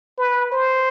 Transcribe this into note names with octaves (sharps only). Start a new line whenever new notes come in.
B4
C5